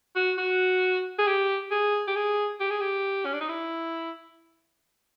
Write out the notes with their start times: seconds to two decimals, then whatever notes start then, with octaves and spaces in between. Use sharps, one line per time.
0.16 F#4
0.38 F#4
1.18 G#4
1.27 G4
1.71 G#4
2.08 G4
2.16 G#4
2.60 G4
2.70 G#4
2.81 G4
3.25 C#4
3.33 D4
3.41 D#4
3.49 E4